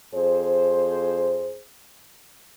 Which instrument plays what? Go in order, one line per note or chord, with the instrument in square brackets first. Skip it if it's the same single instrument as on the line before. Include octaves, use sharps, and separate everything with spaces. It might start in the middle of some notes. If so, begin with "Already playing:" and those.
[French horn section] F2 G#4 C5